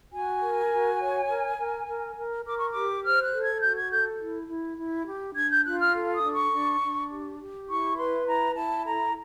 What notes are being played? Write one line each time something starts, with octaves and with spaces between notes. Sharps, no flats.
F#4 G#5
A#4
F#4
C#5
A#4
A#4
A#4
A#4
A#4 D6
C#6
D6
G4
C5 F6
F#6
A4
G#6
F#4 G6
G#6
A4 G6
E4
E4
E4
G4
D4 G#6
G6
F4 F#6
F6
A4
D#6
D4
C#6
D4
D4
G4
G4
E4 C#6
B4 C6
E4 A#5
E4 A5
A4 A#5